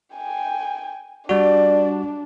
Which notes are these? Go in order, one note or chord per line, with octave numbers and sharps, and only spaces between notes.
G5 G#5
G3 D4 F#4 D5